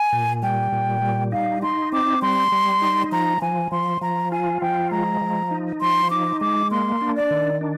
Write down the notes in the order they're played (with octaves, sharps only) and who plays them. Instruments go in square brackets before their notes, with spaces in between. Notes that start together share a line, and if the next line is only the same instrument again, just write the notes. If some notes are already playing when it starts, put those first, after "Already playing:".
Already playing: [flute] G#5
[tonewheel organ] A#2
[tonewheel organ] G3 [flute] G5
[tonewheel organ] A#2
G3
[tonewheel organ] D#4 [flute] F5
[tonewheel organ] D#4 [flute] C6
[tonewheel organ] C4 [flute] D6
[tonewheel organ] G3 [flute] C6
[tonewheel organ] G3
D#4
[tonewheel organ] F3 [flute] A#5
[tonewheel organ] F3 [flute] G#5
[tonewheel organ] F3 [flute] C6
[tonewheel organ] F3 [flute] A#5
[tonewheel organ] F4 [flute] G#5
[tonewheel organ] F3 [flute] G5
[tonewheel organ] G#3 [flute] A#5
[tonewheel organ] F3
D#4
[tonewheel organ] F3 [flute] C6
[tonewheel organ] D#4 [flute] D6
[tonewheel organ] G#3 [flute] D6
[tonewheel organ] A#3 [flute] C6
[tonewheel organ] D4
[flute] D5
[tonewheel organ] D#3
D4